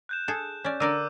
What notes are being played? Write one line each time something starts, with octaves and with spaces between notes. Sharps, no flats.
F#6 G6 E7
G#4 A4
C#4 D5
D3 A#4 D5 D6 E6 D#7